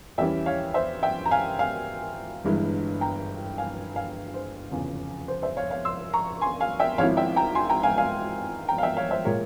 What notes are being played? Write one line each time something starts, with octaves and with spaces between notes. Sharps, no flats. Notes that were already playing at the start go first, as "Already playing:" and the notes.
E2 E3 G3 C#4 E4 E5 G5
C#5 F5
C5 E5
E5 G5
A#5
F5 G#5
F5 G#5
G1 G2 E3 G#3 E4
G5 A#5
F5 G#5
F5 G#5
C5
F1 E2 C#3 F3
C5
C5 E5
C#5 F5
C#5 F5
C6 E6
A#5 C#6
G#5 C6
F5 G#5
E5 G5
G#1 G#2 F3 C4 E4 C#5 F5
E5 G5
G5 A#5
G#5 C6
G5 A#5
F5 G#5
F5 G#5
G5 A#5
F5
E5 G5
C#5 F5
C5 E5
A#2 G#3 A#4 C#5